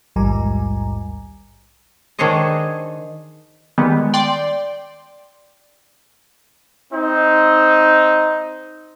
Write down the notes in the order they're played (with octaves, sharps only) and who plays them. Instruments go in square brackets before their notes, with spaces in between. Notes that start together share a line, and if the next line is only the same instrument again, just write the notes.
[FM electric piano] A#1 D#2 G#2 G3 G#5 A#5
[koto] D#3 D4 G#4 C5 C#5 D#5
[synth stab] D#3 G3 G#3 B3
D5 G5 C6
[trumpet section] C4 D#4